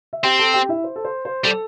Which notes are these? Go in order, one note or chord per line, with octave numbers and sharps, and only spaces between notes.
E5
C4 G4 G5
A4 A5
G4 G5
E4 E5
C5
A4
C5
C5
G3 A4